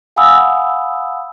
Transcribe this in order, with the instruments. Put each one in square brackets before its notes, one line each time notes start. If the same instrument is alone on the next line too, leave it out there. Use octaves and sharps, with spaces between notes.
[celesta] F5 F#5 G#5 B5 D#6 E6